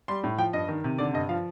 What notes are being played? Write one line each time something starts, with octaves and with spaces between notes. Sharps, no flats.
G3 C6
A2
F3 G5
G2 D#5
D#3
C3
D3 D5
G2 D#5
F3 F5